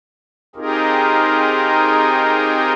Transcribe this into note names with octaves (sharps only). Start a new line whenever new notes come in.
C4 D#4 F4 G4 G#4 A#4